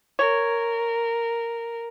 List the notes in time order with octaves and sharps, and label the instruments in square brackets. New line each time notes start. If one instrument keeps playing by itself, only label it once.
[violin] A#4 [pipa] C#5